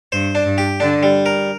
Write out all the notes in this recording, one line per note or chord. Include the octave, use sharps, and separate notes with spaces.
G2 C5
D4
G2
G4
D3 D4
G3
A#4